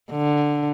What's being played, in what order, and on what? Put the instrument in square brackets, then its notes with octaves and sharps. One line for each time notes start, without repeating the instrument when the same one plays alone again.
[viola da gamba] D3